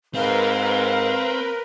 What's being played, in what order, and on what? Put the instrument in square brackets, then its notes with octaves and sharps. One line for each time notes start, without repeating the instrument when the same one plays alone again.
[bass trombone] G#2 [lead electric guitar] C4 [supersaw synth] A#4 B4 [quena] F5